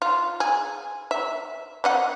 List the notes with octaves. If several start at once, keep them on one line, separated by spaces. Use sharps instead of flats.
F4
G#4
E5
C4 D#5 F#5